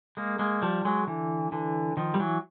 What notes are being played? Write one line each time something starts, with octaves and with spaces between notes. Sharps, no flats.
G#3 A#3
G#3 A#3
F3 G3
F#3 G#3
D3 E3
D3 E3
D#3 F3
G3
E3 F#3